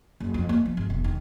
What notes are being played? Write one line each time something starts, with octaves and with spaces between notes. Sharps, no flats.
F#1
F2
A#3
F3
G#1
E1
D#3